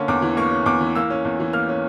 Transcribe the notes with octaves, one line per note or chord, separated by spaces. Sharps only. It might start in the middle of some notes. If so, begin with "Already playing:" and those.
Already playing: D3 A#3 C#4
E2 D6
E3
A#3 C#6
C#4
E2 D6
E3
A#3 E6
C#4
E2
E3
A#3 F6
C#4